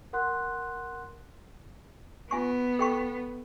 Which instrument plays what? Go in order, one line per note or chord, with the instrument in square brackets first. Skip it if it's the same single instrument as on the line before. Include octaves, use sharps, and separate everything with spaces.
[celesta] A#4 F#5 C6 F#6
[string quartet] B3 [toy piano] F4 G#5 C#6
[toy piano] A4 G5 C#6